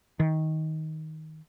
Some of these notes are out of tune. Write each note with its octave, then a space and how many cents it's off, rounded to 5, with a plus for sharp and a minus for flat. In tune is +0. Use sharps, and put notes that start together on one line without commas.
D#3 +15